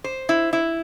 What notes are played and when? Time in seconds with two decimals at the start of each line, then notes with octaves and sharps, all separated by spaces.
0.04 C5
0.29 E4
0.53 E4